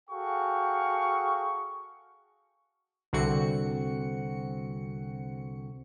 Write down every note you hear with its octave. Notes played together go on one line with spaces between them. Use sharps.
F#4 G#4 A4 F5 G5 C#6
C2 D3 C4 F#4 C#7